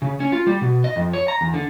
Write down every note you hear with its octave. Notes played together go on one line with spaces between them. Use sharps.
C#3
C#4
F4
G3
B2
D#5
F2
C#5
A#5
E2
D3